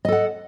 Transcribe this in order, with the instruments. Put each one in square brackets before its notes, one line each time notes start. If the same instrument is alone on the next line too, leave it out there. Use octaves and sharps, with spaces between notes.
[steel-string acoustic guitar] D#5
A4
F#5